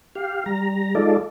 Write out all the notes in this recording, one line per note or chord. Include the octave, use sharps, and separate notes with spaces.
G4 F5
G3 A#5
G#3 D#4 F4 A4 D5